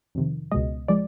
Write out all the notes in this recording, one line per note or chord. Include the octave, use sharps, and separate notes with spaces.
F2 C3 D#3
C#2 B2 G#3 D#5
F3 G#3 D5